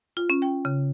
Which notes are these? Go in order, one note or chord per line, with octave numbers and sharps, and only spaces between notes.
F4
C#4
G5
C#3